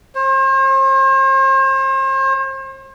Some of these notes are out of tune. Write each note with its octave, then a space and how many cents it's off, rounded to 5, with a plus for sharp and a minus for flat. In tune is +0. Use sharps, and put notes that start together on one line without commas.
C5 +40